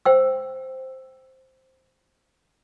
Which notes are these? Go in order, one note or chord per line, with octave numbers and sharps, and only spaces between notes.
C5 G5 E6